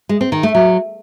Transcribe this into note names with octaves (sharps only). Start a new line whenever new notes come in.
G#3
C4
D#3
A3
F#3